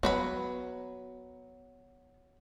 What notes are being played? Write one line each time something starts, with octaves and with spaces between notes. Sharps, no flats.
F#3 B3 B4 B5